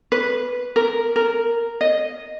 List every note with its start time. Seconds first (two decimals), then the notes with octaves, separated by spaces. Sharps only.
0.12 B4
0.76 A#4
1.16 A#4
1.81 D#5